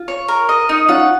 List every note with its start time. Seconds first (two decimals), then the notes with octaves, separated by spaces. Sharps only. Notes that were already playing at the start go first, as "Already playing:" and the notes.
Already playing: F4
0.08 C#5
0.28 A#4
0.49 D#5
0.69 D#4
0.89 C#4 F4 F#5